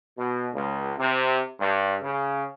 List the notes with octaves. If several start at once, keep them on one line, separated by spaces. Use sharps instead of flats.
B2
C#2
C3
G2
C#3